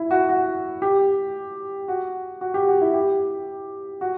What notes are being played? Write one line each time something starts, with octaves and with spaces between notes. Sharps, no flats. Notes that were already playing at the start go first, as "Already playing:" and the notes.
Already playing: E4
F#4
F#4
G4
F#4
F#4
G4
F#4
E4
G4
F#4